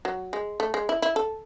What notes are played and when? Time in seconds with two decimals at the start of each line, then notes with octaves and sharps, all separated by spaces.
0.05 F#3
0.33 G#3
0.60 A3
0.74 G#3
0.89 E4
1.02 E4
1.16 A4